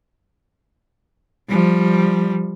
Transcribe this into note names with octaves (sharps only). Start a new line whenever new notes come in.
F3 G3